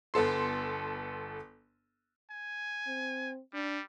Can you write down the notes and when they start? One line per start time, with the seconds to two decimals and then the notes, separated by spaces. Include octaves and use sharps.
0.14 G1 B3 A4 C6
2.31 G#5
2.87 C4
3.54 G3 D4